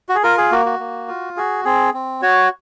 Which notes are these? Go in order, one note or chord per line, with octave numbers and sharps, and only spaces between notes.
F#4
G#4
F4 A#4
G#4
A#3 F#4
F#4
A#3
F4
F#4 G#4
C4 G#4
C4
F#4 C#5